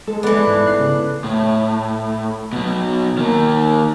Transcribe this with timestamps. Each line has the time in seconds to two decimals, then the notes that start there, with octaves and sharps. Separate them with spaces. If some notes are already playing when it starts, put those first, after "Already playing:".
0.07 G#3 A4
0.23 E3 B3 D4
0.48 G#2
0.66 F#6 C7
0.80 C#3
1.24 A2
2.53 B2 F#3
3.18 D#3 A#3